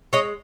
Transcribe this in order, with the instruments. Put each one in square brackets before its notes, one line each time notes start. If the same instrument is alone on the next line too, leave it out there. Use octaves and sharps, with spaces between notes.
[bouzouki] G#3 C#5 D#5